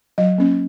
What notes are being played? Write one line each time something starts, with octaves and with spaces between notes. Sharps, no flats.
F#3 D#5
A#3 C#4